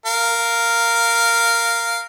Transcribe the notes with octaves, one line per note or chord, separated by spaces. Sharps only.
A#4 F5